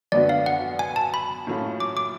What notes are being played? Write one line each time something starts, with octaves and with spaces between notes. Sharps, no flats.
F#2 D3 F#3 B3 F#4 D5
F5
F#5
G#5
A5
B5
A2 F#3 A3 C#4 F4
D6
D6